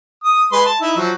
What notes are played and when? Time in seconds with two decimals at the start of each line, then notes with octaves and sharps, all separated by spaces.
0.24 D#6
0.53 G#3 B4 C6
0.66 A5
0.80 D#4 E4
0.97 F3 F#3